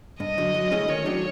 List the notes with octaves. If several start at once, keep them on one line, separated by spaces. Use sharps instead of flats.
G2 D#5
D3 F#3
F#3
A3 C#4 E4 G#4
D#3 C#5
F#3 A3 D4 F#4